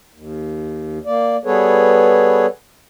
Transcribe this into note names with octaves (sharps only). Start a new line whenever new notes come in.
D#2
A#3 D5
G3 B3 G#4 A4 B4 C#5